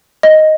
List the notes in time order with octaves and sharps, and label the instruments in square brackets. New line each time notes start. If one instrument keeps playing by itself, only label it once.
[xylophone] D#5